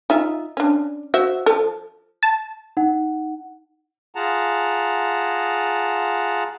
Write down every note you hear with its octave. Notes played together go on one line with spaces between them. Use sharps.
D#4 F4 E5
C#4 D4
F#4 C5 E5
F3 A4
A5
D#4 F#5
F4 G#4 F#5 A5 A#5